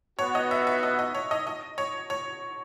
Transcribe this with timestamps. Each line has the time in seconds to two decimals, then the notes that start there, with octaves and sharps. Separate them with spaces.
0.19 B3 F#4 B4 C#5 F#5
0.35 D#5
0.51 E5
0.67 E5
0.83 D#5
0.99 D#5
1.15 C#5
1.31 D#5
1.47 D#5
1.78 C#5
2.10 C#5